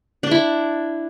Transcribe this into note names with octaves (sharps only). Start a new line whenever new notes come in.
D4
E4